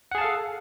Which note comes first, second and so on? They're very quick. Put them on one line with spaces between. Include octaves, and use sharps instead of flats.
F#5 G#4 A5 F5 A4